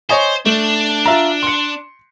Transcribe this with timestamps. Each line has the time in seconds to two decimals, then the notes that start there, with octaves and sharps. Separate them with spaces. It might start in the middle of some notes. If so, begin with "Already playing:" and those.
0.09 C5 C#5 D#5 G#5
0.46 A3 D4
1.06 F4 E5 A#5
1.43 C6 C#7